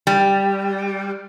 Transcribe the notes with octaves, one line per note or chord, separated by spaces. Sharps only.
G3